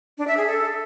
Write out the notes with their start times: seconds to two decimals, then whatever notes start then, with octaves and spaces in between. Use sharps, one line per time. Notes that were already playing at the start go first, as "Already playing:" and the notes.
0.18 D4
0.28 E5
0.37 G#4
0.47 A4